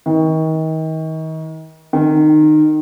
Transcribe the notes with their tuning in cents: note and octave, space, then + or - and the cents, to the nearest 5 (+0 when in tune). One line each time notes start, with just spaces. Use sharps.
D#3 +35
D#3 -20